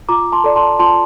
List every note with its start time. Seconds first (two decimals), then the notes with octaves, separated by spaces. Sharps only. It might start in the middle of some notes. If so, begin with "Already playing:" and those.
0.09 F4 A#5 D6
0.32 A5 C6
0.44 A4 D5
0.56 A5 C6
0.79 F4 A5 C6